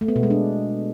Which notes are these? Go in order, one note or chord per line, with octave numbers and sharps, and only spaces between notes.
A3
B3
B2
G#3
D4